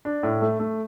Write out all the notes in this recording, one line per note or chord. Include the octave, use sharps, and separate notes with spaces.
D4
A2
A3
A3